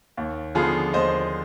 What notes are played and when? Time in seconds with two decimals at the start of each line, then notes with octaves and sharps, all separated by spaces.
0.17 D#2
0.55 D3 F3 B3 F4 G#4
0.94 D#2 C5 D#5